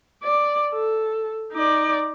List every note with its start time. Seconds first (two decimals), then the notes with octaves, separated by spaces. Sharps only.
0.23 D5
0.74 A4
1.52 D#4 D5